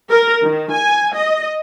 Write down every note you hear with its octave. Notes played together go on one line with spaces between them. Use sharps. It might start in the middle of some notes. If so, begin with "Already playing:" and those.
A#4
D#3
G#5
D#5